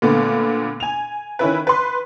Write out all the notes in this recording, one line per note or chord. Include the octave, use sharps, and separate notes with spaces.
A#2 D3 A3 B3
G#5 F7
D#3 C#4 E4 B4
B4 C6